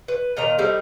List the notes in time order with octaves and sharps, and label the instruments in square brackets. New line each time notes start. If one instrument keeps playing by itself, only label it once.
[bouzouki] B4
A#2 D#3 D#5 A#5
G3 A3 C4 D#4